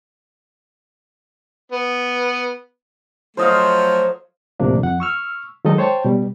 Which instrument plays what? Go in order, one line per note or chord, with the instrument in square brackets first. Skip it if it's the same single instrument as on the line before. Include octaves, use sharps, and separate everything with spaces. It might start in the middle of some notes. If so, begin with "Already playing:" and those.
[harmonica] B3
[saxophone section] F3 F#3 A3 [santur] C5 D#5 F5
[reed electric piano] D2 A2 C3 F3 A#3 D4
F2 F#5
C#6 E6 F6
D#3 F#3 G#3 D#4 A4 D#5
C5 C#5 G5 A5
B2 G3